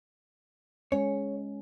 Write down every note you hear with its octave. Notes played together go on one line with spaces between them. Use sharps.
G#3 C#4 C#5